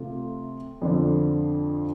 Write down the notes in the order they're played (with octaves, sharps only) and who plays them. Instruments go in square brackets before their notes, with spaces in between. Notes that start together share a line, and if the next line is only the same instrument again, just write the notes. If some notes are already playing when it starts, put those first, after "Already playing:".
Already playing: [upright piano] C3 A3 F4
F2 D3 F3 D4